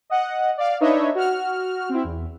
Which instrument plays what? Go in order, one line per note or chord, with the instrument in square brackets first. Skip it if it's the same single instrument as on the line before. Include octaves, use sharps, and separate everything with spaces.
[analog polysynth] D#5 F#5
D5 F5
D4 D#4 B4 C#5 D#5 E5
F#4 F6
C4 E4
E2